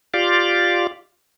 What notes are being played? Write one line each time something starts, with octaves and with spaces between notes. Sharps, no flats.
F4 G4 D5 F5